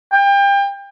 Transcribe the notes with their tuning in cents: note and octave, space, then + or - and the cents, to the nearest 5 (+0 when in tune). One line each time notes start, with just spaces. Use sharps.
G5 +30